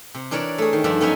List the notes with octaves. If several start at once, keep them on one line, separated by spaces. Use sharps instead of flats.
C3
E3 D4 A#4 C#5 D5
A3 G#4
D#3
G2 F3 D4 E5
F#2 B3 C#4 D#4 E5 G#5